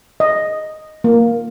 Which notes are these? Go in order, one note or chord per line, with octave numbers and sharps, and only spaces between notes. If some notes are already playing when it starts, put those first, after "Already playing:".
D#5
A#3